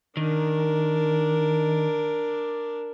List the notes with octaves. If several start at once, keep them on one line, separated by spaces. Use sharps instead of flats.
D#3 D4 A#4